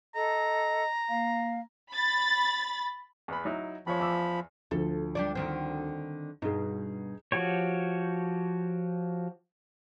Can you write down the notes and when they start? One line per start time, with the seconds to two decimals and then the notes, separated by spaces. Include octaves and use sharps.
0.15 A4 D#5 A#5
1.09 A#3 F5
1.92 B5 A6
3.28 E2 B3 B5
3.45 F#3 D#4 E4
3.87 E2 F3 C#5 B5
4.00 E2 D6 E6
4.71 D2 F3 A4
5.15 G3 D4 D5
5.35 D3 D#3 C4
6.42 G2 B2 D#4 G#4
7.32 F3 F#4 G4 C#5